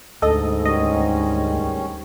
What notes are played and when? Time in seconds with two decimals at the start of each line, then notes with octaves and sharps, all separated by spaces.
0.22 D2 G#2 A4 D#5
0.65 D#3 G3 C#4 D#5